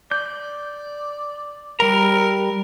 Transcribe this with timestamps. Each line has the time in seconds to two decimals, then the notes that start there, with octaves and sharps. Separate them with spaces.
0.11 D5 G6
1.80 G3 A#4 A#5